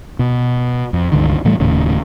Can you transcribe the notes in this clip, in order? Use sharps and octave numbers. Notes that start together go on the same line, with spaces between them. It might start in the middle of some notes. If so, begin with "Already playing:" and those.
B2
F2
C#2 G2 D3 D#3
A2 E3 G3 A3
D#1 D#2 A2 C#3